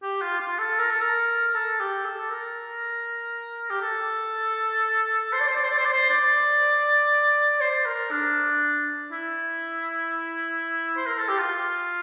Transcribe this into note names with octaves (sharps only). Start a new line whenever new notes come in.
G4
F4
F4
A4
A#4
A4
A#4
A4
G4
A4
A#4
G4
A4
C5
D5
C5
D5
C5
D5
C5
D5
C5
D5
C5
A#4
D4
E4
C5
A#4
A4
G4
F4